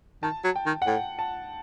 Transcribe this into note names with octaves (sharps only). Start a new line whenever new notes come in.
D#3 A5
F#3
G5
D#3
F#5
A2 G5
A5